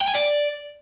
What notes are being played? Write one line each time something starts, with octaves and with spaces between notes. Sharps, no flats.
G5
G#5
D5